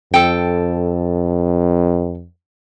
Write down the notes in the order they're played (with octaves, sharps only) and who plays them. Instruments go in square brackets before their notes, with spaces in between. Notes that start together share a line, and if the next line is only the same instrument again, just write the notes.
[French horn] F2 [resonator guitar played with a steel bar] A4 G5